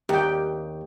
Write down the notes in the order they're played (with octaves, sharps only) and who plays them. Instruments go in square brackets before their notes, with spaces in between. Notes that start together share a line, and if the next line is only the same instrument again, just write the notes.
[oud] D#2 [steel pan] G4 G5